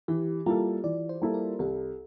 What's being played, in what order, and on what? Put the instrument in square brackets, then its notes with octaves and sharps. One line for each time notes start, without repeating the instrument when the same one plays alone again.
[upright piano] E3 [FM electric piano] G4
[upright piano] G3 A#3 E4 A4 [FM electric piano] F4
[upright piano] E3 [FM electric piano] D5
[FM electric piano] C5
[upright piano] G3 A#3 E4 A4
[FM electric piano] A#4
[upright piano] C2 [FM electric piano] A4